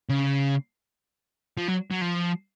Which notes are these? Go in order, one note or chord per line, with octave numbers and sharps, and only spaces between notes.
C#3
F3
F#3
F#3
F3